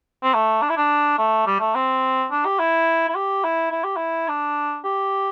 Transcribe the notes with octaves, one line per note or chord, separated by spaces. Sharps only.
C4
A3
D4
E4
D4
A3
G3
A3
C4
D4
G4
E4
E4
G4
E4
E4
G4
E4
D4
G4